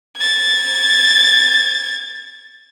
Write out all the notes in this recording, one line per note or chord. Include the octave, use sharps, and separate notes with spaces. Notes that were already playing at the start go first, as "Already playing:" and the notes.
G#6 A6